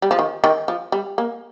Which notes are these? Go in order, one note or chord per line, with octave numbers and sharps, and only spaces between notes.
G3
F3
D#3
D#3
F3
G3
A#3